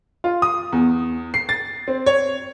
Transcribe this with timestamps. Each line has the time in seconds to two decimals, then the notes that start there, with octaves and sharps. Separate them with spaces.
0.24 F4
0.42 D#6
0.72 E2
1.34 C7
1.49 A6
1.88 C4
2.06 C#5